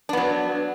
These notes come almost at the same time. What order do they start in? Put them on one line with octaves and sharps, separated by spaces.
D4 B3 F#3